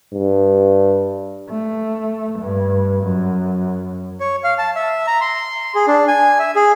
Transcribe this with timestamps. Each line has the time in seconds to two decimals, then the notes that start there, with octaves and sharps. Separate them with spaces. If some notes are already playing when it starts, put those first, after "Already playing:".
0.13 G2
1.50 A3
2.39 G2
3.04 F#2
4.20 C#5
4.44 F5
4.58 A5
4.76 E5
5.07 A#5
5.21 C6
5.75 G#4
5.87 D4
6.08 G#5
6.39 E5
6.56 G#4